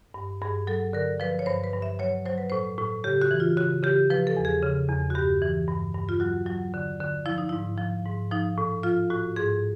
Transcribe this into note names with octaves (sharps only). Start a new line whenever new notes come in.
G2
G2 G#4
F#3 A4
D3 A#4
F3 B4
C#5
G2 C5
B4
G2
E5
F#3 C#5
F#3 C5
B4
A2 C5
A2
C#3 G4
F#4
E3
F4
C#3 F#4
C#3 G4
F3 B4
A4
E2
G#4
C#3
E2
F#4
G2 G4
E3
G2
G2
F4
F#3 F#4
F#3
D3
D3
F3 E4
D#4
G#2 E4
F3
G#2
F3 D#4
A2
F3 F4
A2 F#4
G#2 G#4